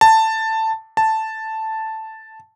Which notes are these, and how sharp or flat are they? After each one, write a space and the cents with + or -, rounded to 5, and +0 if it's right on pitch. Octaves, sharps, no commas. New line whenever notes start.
A5 +10
A5 +0